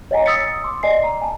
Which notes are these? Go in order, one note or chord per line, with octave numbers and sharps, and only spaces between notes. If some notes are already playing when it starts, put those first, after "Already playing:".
C#5 D#5 F#5 G#5 A#5
D#6 E6 A6 B6 C#7
C6 D6
D5 D#5 G#5 C7
A#5
G#5 A5